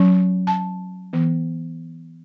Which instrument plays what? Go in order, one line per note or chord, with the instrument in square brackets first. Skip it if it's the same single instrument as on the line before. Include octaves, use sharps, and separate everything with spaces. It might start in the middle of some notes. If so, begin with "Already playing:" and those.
Already playing: [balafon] F#3 C#4
A5
E3 B3